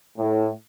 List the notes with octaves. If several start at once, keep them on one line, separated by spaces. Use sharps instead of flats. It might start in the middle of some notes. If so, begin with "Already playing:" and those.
A2